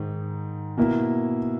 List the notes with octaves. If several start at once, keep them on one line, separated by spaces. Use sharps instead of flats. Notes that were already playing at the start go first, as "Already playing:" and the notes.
Already playing: G#2 D#3
B2 A#3 E4